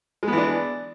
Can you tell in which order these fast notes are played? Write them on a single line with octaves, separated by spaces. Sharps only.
G#3 B3 E3 D4